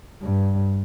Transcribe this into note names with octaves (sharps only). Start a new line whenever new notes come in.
G2